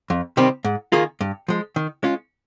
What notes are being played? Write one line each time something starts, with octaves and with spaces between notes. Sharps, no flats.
F2
C3 D#3 G3 C4
G#2
D#3 A#3 F4 G#4
G2
F3 G#3
D#3
G#3 C#4 F4